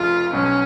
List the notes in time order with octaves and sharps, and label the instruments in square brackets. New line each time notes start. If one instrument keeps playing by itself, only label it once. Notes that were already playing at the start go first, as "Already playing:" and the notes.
Already playing: [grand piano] F1 F2 C#3 F3 [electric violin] F4
[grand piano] B1 B2 F#3 [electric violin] C#4